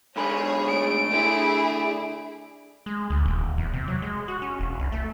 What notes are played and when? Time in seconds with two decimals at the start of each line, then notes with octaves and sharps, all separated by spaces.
0.16 G#2 D3 G#4 C#5 B5
0.68 A3 D7
1.12 D3 E4 G#4
2.86 G#3
3.10 D2
3.26 D#1
3.58 E2
3.73 C3
3.88 F#3
4.02 G#3
4.28 F#4
4.42 C#4
4.59 E1
4.79 C2
4.92 A3